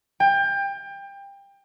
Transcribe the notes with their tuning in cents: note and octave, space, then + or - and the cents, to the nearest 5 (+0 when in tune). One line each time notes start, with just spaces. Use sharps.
G5 +25